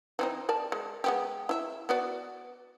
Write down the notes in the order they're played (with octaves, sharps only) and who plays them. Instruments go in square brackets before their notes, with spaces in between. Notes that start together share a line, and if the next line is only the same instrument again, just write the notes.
[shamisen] E3 C4 D#4
A#4 D5 A5
G#3
G#3 B3 G4
E4 E5
B3 F#4 D5